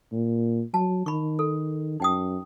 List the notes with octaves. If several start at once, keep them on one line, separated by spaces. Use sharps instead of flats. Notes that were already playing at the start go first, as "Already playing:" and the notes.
A#2
F#3 A5
D#3 B5 C#6
A4
F#2 D#4 G5 D#6